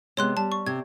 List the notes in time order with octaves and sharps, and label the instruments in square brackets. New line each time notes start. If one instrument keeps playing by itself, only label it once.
[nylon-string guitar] C3 G#3 B3 [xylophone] C#5 C6 F#6
[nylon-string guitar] G3 [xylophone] A5
[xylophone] C#6
[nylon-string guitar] C3 [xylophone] G#6